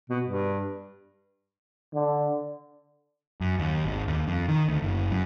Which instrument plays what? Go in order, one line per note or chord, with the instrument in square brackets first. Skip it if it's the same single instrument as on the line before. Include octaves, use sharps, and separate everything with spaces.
[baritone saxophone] B2
G2
[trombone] D3
[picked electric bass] F#2
D#2
G#1
D#2
F2
D#3
D2
F#1
F#2